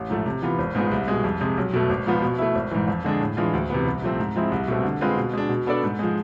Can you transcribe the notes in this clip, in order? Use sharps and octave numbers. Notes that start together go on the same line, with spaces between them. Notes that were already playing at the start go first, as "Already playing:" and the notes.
Already playing: A1
G#2 F3 A3
C3
E3 B3 F4
G#1
G#2 G#3 B3 F4
C2
B2 G#3
F2
C3 G#3
B1
B2 A3
G#1
G#2 F3 B3 F4
B2
A3 E4
G#1
G#2 E3
F2
D3 G#3 D4
A2
E3 G#3 D4 F4
D2
C3 E3 B3
C2
C3 F3 A3 C4
G#2
F3 G#3 C4 E4
C2
B2 A3 C4
D3
G#3 C4 F4 B4
B2
G#3 D4
B2
B3 D4 A4 D5
G#2
F3 G#3